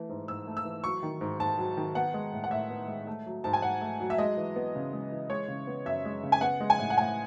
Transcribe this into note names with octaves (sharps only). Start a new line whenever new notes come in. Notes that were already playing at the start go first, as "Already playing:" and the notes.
Already playing: E3 A3
G#2
G#2 E6
A3
E6
E3
F#3 C#6
D#3
G#2
G#2 A5
F#3
D#3
B3 F#5
G#3
A2
F#5
A2 E5
B3
G#3
A3
F#3
G#2 A5
G#5
G#2 F#5
A3
F#3
E5
G#3 D#5
E3
B3
C#3
G#3
E3
G#3 C#5
C#3
B3
F#2 E5
G#3
C#3
G#5
B3 F#5
G#3
G#5
A2
F#5
A2 G#5